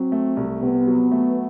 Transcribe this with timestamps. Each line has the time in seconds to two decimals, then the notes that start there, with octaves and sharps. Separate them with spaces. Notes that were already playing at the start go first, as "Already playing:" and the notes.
Already playing: F#3 C4
0.12 A3
0.37 C2
0.61 C3 B3
0.87 F#3
1.12 A3